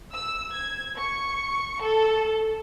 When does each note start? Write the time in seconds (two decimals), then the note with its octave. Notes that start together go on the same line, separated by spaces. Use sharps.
0.11 E6
0.51 G#6
0.97 C#6
1.81 A4